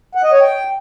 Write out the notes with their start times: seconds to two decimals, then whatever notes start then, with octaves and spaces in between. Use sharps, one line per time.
0.15 F#5
0.24 D#5
0.32 C#5
0.41 G5